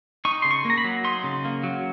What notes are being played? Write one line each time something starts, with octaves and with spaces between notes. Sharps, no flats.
D#4 C#6
C#3 C6
C#6
A#3 A#5
B5
F#3
D#4 C6
C#3
A#3
F#3